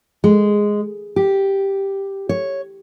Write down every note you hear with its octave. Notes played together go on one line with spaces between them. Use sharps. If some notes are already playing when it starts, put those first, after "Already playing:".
G#3
G4
C#5